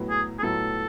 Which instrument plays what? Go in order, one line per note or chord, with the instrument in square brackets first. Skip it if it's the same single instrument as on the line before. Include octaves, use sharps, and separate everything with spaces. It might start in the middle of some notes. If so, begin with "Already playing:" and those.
Already playing: [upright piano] A2 F#3 B3 E4
[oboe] G#4
G#4
[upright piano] A2 F#3 B3 E4 [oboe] A4